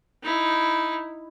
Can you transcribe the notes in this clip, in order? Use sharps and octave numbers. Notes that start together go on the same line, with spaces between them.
D#4 E4